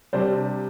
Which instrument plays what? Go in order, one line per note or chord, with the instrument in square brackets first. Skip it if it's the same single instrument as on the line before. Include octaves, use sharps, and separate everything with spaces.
[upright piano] C3 G3 D4 C5